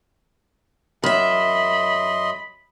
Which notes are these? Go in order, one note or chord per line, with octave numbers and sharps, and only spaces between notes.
F#2 D#5 E5 B5 C6